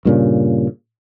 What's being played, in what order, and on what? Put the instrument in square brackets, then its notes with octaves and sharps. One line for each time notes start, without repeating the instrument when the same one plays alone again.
[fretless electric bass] G2 A#2 C#3